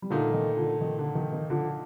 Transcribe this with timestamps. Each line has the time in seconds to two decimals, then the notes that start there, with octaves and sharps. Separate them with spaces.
0.02 G3
0.10 A#2 D3 F3 A3 D#4
0.33 D#3
0.57 D3 F3
0.81 D#3
0.99 D3
1.15 D#3
1.32 D#3
1.50 D3 F3